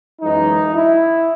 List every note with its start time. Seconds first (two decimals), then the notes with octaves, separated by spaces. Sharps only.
0.20 F#2 E3 G#3 D#4
0.73 E4